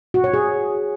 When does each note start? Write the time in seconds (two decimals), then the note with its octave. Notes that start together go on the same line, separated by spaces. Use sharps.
0.14 F#4
0.24 C#5
0.34 G#4